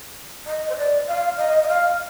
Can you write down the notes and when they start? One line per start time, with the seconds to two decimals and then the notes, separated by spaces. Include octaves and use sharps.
0.46 D#5
0.69 C5
0.76 D5
1.08 F5
1.38 D#5
1.63 D#5
1.68 F5